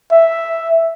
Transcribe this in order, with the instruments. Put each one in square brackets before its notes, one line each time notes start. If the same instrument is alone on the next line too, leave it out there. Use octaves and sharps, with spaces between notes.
[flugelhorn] E5